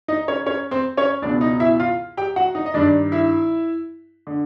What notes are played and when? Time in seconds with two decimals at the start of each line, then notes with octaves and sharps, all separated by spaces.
0.08 D#4 D#5
0.28 C#4 C#5
0.46 C#4 C#5
0.71 C4 C5
0.97 C#4 C#5
1.22 C#2 B2 D4 D5
1.41 D#4 D#5
1.60 E4 E5
1.80 F4 F5
2.17 G4 G5
2.36 F#4 F#5
2.55 D#4 D#5
2.66 D#5
2.74 G2 D#3 D4 D5
3.12 E4 E5
4.27 D3